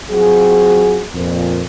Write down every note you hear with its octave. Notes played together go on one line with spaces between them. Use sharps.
F#3 C4 F4 F#4 G#4
F2 A#2